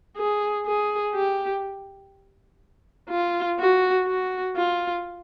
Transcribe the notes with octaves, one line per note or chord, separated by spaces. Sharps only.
G#4
G#4
G4
F4
F#4
F#4
F4